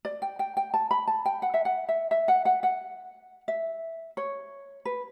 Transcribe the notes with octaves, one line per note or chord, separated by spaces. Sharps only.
D5
G5
G5
G5
A5
B5
A5
G5
F#5
E5
F#5
E5
E5
F#5
F#5
F#5
E5
C#5
B4